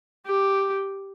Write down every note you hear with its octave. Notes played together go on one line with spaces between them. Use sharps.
G4